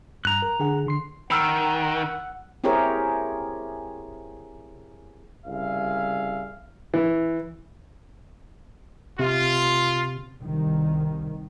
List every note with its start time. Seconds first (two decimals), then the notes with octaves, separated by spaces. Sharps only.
0.25 G2 A#5 F#6
0.42 A#4
0.59 D3 G#4 F#5
0.87 D3 C6 C7
1.31 D#3 F#5 B5 E6 F6
2.64 C4 E4 G4 G#4 A#4 C#5
5.46 C2 C#3 G3 G#4 E5 F5
6.94 E3
9.19 C3 F4
10.41 C2 D#3